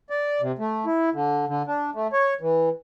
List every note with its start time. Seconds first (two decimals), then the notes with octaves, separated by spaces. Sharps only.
0.10 D5
0.41 C3
0.58 A3
0.86 E4
1.14 D3
1.48 D3
1.67 D4
1.95 A3
2.13 C#5
2.41 E3